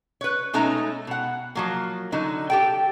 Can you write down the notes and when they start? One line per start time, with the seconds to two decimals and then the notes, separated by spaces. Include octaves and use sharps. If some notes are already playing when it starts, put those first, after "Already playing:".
0.21 B4 C#5
0.53 B2 G#3 A3 C#4 D#4 A#5
1.07 B2 F#5
1.55 F3 F#3 A#3
2.12 D3 F#3 D#4
2.50 G4 A4 G5